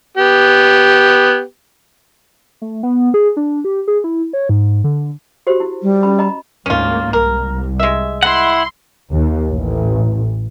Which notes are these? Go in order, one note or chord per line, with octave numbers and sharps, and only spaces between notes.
B3 G4
A3
B3
G#4
D4
G4
G#4
E4
C#5
G#2
D3
F#4 G4 C5
E4
G3
C#4 B5
D#5 A#5 B5
D2 G#2 A#3 C#4 F4
C2 A#4
G#3 E5
E4 F#5 C6
D#2
A1